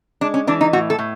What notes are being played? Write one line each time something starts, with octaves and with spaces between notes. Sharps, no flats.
G#3 D4
C#4
E3 D4
D#4
A2 F#4
A4
A2